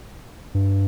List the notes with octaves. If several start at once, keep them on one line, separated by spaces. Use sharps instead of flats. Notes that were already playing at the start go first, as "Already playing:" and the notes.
G2